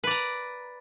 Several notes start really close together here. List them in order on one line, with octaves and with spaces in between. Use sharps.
B4 D5 A#5